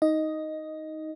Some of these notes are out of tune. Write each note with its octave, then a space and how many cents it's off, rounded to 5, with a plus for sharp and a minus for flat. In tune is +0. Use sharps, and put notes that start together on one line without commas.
D#4 +15 D#5 +0